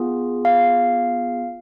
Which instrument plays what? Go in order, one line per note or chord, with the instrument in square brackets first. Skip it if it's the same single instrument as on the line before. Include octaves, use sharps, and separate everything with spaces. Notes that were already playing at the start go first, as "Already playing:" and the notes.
Already playing: [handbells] B3 F4 G#4
F5